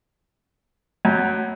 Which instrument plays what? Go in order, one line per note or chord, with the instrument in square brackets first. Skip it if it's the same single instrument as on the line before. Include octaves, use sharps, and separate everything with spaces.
[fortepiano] F#2